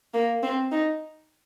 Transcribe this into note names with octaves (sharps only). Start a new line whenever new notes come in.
A#3
C4
D#4